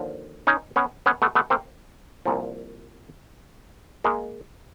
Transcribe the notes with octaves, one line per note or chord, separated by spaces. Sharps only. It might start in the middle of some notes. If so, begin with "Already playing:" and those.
Already playing: D#2 D3 F3
C#4 D#4
B3 C#4
B3 C#4
A3 B3
A3 B3
A#3 C4
C2 A#2 F3
G#3 A#3